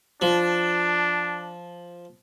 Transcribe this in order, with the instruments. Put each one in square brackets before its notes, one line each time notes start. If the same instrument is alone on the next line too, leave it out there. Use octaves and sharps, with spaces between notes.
[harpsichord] F3 [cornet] D4